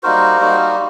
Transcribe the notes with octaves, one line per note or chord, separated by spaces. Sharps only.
G3 A#3 D#4 F#4 A#4 C5
G3 A#3 D#4 F#4